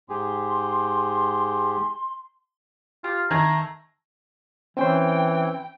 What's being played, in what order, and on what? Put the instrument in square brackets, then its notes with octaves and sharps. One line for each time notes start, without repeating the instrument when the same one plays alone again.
[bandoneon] G#2 G4 G#4 [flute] C6
[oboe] F4 [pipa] G4
[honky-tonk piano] D#3 G#6 [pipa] A3 G#5 [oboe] A#5
[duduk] E3 [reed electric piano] C4 C#4 C5 [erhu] G5